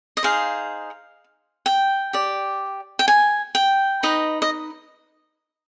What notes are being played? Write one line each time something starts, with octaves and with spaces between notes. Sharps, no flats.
D#5
D#4 G#4 C5 F5
G5
G4 D5
G5
G#5
G5
D#4 B4 D#5
D#5